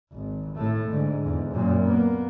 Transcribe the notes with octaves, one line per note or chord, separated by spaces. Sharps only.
G#1
A2 A3
G#2 D3
E2 G#2
F#2 A#2
A#3 B3